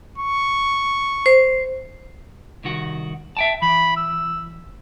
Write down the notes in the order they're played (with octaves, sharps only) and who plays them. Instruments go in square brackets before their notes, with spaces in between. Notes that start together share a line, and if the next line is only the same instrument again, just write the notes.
[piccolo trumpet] C#6
[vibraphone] C5
[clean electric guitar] C2 D#3 F#4
E5 G5 A5
[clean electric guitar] E3 [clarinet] B5
[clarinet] E6